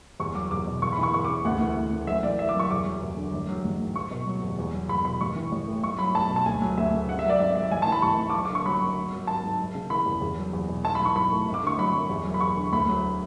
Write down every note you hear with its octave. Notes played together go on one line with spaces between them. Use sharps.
E2 C#6
F#3 D6
E2 D6
B2
E2 C#6
B5
E3 C#6
E2 C#6
D6
C#3
D2 F#5
E3
D2
C#3
F#1 E5
E3 D5
F#1 E5
D6
F#2
C#6
E2 D6
F#3
E2
D3
A1
F#3
A1
G#2
F#1 C#6
B2
F#3
E2
E2
F#3
E2 B5
B2 B5
A1 C#6
E3
A1
A2
B1 C#6
F#3 B5
B1 A5
B2
A5
D2 G#5
F#3
D2 E5
C#3
G#1 F#5
E5
F#3 D5
G#1 E5
G#2 E5
A1 G#5
A5
E3
B5
A1 C#6
G#2
D6
F#1 C#6
D6
D3
C#6
F#3 B5
F#2
G#1
F#3
G#1 A5
G#2
F#1
C#3
E3 B5
E2
E2
F#3
E2
B2
B1 A5
B5
E3
C#6
B1 B5
A2
G#1
D6
D3 C#6
F#3 B5
F#2
E2
F#3
B5
E2 C#6
D3
D2 B5
F#3